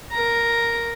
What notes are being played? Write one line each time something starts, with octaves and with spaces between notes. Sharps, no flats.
A#4 A#5